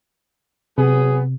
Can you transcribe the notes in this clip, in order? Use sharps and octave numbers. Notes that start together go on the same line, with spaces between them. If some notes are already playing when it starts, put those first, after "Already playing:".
C3 F#3 B3 G#4